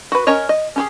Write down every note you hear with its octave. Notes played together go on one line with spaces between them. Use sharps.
F#4 B4
C#4 A#4 C#5 D#5
D#5
C#4 G4 G#4